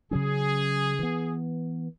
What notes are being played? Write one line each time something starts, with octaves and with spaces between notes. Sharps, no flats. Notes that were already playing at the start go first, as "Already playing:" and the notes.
C#3 F#3 C#4 G#4
E3 B3